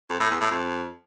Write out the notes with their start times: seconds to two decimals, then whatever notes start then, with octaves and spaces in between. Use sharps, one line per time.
0.10 F2
0.20 A2
0.31 E2
0.41 A2
0.51 F2